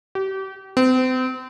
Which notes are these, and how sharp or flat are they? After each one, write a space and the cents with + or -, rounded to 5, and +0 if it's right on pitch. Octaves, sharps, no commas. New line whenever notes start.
G4 -35
C4 -35